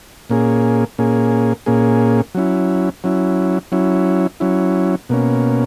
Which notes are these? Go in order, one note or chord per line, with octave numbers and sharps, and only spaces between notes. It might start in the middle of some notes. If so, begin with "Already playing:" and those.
A#2 A#3 C#4 G#4
A#2 A#3 C#4 G#4
A#2 A#3 C#4 G#4
F#3 C#4 E4
F#3 C#4 E4
F#3 C#4 E4
F#3 C#4 E4
B2 A#3 C#4